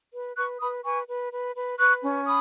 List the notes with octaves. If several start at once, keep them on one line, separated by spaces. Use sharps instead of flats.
B4
B4 C#6 F#6
B4 B5 D#6
B4 G#5 C#6
B4
B4
B4
B4 C#6 F#6
C#4
B5 D#6